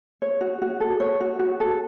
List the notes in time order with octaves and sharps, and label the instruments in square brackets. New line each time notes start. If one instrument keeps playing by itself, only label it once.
[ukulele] C#5
F#4
F#4
A4
C#5
F#4
F#4
A4